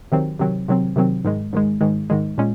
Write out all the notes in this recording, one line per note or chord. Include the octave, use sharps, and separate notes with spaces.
C3 D#3 F#3 C4
C3 D#3 F#3 C4
C3 D#3 F#3 C4
C3 D#3 F#3 C4
G#2 D#3 G#3
G#2 D#3 G#3
G#2 D#3 G#3
G#2 D#3 G#3
A#2 G#3 C#4